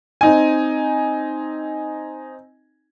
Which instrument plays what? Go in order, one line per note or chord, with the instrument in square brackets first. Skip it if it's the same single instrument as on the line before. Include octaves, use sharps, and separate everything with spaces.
[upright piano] C4 D#4 G#5